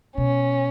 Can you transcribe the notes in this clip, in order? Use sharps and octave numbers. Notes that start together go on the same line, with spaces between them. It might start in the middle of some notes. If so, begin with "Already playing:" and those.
B2 C#4